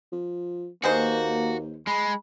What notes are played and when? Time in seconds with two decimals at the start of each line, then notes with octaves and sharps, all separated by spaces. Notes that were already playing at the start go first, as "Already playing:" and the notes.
0.12 F3
0.84 D#2 B2 A#3 F#4 G#4 C5
1.87 G#3 B5